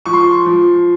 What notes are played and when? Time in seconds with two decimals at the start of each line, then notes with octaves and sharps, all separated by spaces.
0.06 F3 C#6
0.13 C6
0.20 C#6
0.46 F3